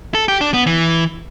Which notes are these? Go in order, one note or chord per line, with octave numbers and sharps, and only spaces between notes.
A4
G4
D4
B3
E3